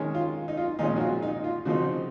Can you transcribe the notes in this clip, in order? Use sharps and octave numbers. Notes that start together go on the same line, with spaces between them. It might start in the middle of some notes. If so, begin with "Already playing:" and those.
Already playing: D#3 G#3 C#4
F4
D#4
F4
A#2 F3 G#3 C#4 D#4
F#4
F4
D#4
F4
C#3 F3 C4 D#4 F#4